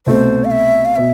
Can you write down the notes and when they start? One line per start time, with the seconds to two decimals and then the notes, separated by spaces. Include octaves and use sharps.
0.06 C2 B2 A3 C5
0.45 F5
0.51 E5
0.85 F5
0.96 B2 E5